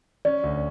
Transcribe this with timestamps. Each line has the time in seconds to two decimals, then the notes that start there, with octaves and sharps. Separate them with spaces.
0.25 C#4 D5
0.43 D2